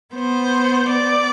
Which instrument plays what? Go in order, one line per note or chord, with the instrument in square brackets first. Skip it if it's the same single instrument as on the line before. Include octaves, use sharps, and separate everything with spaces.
[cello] B3 [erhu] C5
[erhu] D5